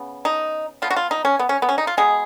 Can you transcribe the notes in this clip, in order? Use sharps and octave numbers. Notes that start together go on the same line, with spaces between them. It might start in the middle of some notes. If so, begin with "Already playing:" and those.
Already playing: C#3 B3
D#4
F3 B3 F4
F#4
F4
D#4
C#4
B3
C#4
B3
C#4
D#4
F4
B2 G#3 B3 G#4